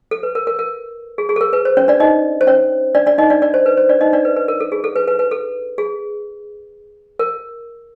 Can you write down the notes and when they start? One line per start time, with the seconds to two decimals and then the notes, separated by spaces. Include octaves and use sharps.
0.11 A4
0.23 B4
0.35 A#4
0.47 A#4
0.59 A#4
1.18 G#4
1.29 G#4
1.36 A4
1.41 A#4
1.53 B4
1.65 C5
1.77 C#4 C#5
1.88 D4 D5
2.00 D#4 D#5
2.41 C5
2.47 C#4 C#5
2.95 D4 D5
3.06 D4 D5
3.18 D#4 D#5
3.30 D4 D5
3.42 D4 D5
3.54 C5
3.66 B4
3.77 C5
3.89 D4 D5
4.01 D#4 D#5
4.13 D4 D5
4.25 B4
4.36 B4
4.48 A#4
4.60 A4
4.72 G#4
4.84 A4
4.96 B4
5.08 B4
5.19 B4
5.31 A4
5.78 G#4
7.19 A#4